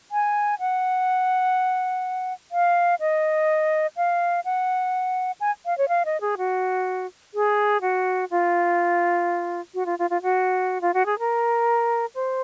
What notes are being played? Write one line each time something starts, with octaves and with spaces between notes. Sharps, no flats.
G#5
F#5
F5
D#5
F5
F#5
G#5
F5
C#5
F5
D#5
G#4
F#4
G#4
F#4
F4
F#4
F4
F4
F4
F#4
F4
F#4
G#4
A#4
C5